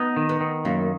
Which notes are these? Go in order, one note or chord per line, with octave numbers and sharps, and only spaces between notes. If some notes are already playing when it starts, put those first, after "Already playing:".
Already playing: B3 D#4
D#3
B3
D#3
F#2 A#3